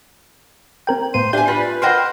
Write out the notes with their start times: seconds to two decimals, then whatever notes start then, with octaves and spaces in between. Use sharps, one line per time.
0.87 C4 A#4 G5
1.14 A2 B3 C5 D#7
1.33 D4 G4 E5 G#5 G6
1.48 F4 B4
1.82 A#4 C5 D#5 F#5 G5 C6